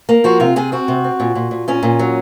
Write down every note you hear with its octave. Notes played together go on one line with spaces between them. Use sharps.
A#3
F3 F#4
C3 F4
C3 G#4
C4 F#4
C3
C4
A#2
A#2
A#2
A#2 C#4
A#2
F#3